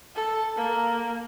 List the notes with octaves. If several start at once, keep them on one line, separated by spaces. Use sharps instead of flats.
A4
A#3